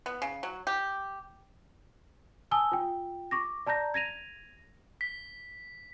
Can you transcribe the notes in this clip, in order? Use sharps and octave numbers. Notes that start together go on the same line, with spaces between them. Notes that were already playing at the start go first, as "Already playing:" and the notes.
B3
C#3
F#3
G4
G#5 A5 D#6 E6 G7
F4 G5
C#6 D6 A#6
D5 A5 A#5 G6 A#6
G#6 A#6 D#7 F7
B6